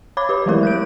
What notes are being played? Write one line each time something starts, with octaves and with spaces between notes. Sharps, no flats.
C#5 B5 D6 G#6
G4 B4
E3 F#3 G#3 A3 E4 A#4
F#6 G6 D7